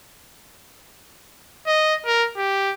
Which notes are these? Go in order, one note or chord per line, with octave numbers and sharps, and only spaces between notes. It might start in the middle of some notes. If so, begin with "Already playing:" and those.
D#5
A#4
G4